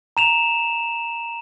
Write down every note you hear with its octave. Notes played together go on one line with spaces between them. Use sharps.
A#5 E7 F7